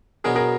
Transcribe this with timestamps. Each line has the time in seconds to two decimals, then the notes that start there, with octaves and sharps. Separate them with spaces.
0.24 B2 F#3 B3 D4 G#4 A#4
0.35 G#4 A#4